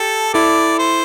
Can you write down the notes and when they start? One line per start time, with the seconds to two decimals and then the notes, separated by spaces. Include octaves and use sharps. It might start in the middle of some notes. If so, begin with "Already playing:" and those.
Already playing: G4 A4
0.34 E4 A4 D5
0.79 C5